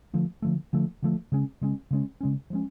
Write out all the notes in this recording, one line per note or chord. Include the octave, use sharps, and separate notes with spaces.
D3 F3 A3
D3 F3 A3
D3 F3 A3
D3 F3 A3
C#3 G#3 C#4
C#3 G#3 C#4
C#3 G#3 C#4
C#3 G#3 C#4
F3 G#3 C#4